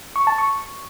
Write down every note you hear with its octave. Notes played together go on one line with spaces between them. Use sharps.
C#6
A5
C#6